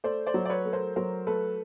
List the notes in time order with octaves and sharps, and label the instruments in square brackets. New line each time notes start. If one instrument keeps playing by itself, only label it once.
[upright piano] A3 [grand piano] C5 D5
[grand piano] C5 D5
[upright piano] F#3
[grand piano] D5
B4 C#5
[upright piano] A3
[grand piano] A#4 C5
[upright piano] F#3 [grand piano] A#4 C5
[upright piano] A3 [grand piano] A4 B4